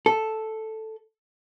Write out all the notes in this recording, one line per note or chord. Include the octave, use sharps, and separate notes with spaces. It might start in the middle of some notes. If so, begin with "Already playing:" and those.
A4